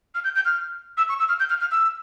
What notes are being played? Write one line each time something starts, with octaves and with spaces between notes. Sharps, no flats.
F6
G6
G6
F6
E6
C#6
E6
F6
G6
F6
F6
E6